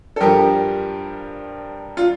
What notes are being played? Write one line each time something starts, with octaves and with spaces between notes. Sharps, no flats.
A4
G2 F3 G4 A#4
F4